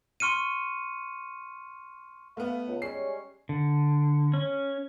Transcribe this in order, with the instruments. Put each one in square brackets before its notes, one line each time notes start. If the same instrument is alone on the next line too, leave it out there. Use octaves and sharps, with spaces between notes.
[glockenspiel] C6 C#6 F6 C#7 D#7
[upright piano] A3 B3 [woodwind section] F5
[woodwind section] C#2
[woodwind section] G3 G#3 C#4 [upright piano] C7
[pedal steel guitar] D3
C#4